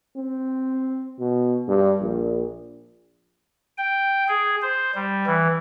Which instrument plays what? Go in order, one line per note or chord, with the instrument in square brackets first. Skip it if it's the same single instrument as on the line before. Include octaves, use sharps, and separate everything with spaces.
[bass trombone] C4
B2
G2
A#1
[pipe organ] G5
G#4
C5
G3
E3